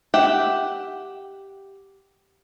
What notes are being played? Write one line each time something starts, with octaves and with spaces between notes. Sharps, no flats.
G4 E5 F#5 G5